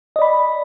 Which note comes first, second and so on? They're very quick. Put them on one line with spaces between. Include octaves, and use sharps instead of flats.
D#5 D5 B5